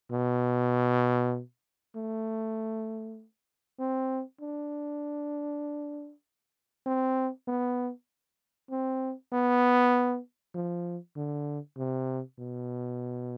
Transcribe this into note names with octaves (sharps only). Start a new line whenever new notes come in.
B2
A3
C4
D4
C4
B3
C4
B3
F3
D3
C3
B2